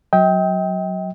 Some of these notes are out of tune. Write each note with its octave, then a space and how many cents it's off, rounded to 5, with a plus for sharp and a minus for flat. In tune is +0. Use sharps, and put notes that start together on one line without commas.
F#3 +0 D#5 +45 G5 +0